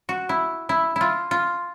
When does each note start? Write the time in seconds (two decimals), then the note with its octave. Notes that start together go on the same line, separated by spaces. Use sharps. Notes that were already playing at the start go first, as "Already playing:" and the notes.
0.09 F#4
0.29 E4
0.69 E4
0.96 E4 F4
1.31 F4